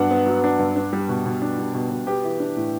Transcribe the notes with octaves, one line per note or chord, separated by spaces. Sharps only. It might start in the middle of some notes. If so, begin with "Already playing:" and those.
Already playing: G2 F#3 B3 D4 F#5
B3
F#3
D4
G2
D4
G3
B2
B2
D4
G3
B2
B2
B3 G4
E3
D4
A2